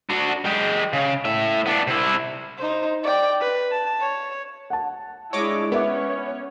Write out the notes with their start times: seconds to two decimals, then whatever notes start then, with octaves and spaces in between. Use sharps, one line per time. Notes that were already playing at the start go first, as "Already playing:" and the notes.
0.09 D4 F#4
0.45 G#3 G4
0.93 C#3
1.25 A2 E5
1.66 B3 D4
1.87 C3 E4
2.58 D#4 C5
3.04 D5 G5
3.40 B4
3.71 A5
4.00 C#5
4.70 F#5 A5
5.33 G#3 D4 E4 C#5 D#5 D6
5.72 B3 C#4 B4 C#5 E5 D6